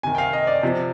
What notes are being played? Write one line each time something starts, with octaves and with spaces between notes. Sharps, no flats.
C3 D#3 G#5
G5
F5
D#5
D5
C3 F3